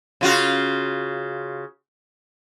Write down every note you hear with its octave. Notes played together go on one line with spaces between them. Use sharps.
C#3 F4 F#4